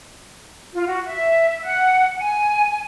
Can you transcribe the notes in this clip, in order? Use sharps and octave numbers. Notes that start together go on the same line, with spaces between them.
F4
F#4
E5
F#5
G#5